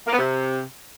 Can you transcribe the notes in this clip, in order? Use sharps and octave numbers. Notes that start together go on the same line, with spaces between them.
A#3
B3
C3